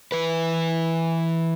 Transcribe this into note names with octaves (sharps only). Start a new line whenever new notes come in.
E3 B4